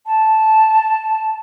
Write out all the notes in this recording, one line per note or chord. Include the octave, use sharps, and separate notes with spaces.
A5